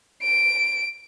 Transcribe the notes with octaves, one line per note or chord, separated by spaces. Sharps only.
D7